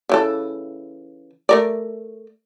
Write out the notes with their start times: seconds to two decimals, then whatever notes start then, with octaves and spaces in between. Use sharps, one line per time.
0.09 C#3 E3 A4
1.49 A3 A#4 D5